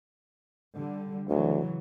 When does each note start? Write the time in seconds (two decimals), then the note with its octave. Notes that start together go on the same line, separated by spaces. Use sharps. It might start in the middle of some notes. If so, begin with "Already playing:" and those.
0.75 D3 G3
1.29 D2 C#3 E3 F#3